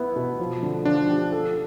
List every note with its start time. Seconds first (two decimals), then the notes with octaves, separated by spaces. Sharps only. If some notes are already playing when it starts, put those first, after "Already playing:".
Already playing: B3 E4 B4
0.16 B2
0.39 F3
0.63 D3
0.85 F3 D4
1.09 G4
1.32 A4